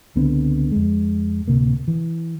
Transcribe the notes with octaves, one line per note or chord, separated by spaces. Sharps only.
C#2 D3 B3 C4
F2 G#3
D1 F2 C3 A#3
E3